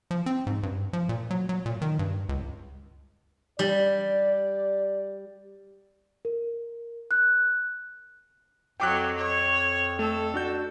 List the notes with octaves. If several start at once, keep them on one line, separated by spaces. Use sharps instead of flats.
F3
C4
G#2
G2
F3
A#2
F#3
F#3
A#2
D#3
G2
C#2
G3 D5
A#4
F#6
F2 F#3 G5 D6 F#6
C#5
A3 A4
D4 F#4 G6